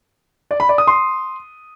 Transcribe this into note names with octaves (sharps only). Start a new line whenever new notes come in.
D5
B5
D5
D#6
C6